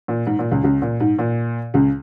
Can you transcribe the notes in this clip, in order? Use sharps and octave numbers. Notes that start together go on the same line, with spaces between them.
A#2
G#2
A#2
C#2 C#3
C#2 C#3
A#2
G#2
A#2
C#2 C#3